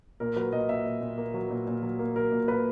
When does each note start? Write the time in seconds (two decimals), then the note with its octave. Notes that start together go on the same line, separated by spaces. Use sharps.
0.20 A#2 A#4
0.36 F#3 B4
0.52 A#2 D#5
0.69 A#2 E5
0.86 A#2
1.01 A#2
1.18 A#3
1.34 F#3
1.50 A#2
1.67 A#2
1.82 F#3
1.99 A#3
2.15 F#3 A#4
2.32 A#2
2.48 A#2 B4